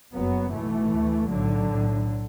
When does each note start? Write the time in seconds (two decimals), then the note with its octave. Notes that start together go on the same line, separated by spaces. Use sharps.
0.14 F#1 F#2 F#3 B3
0.52 B1 B2 E3 A3
0.91 D2
1.29 B1 A2 D3 F#3
1.67 B1 A2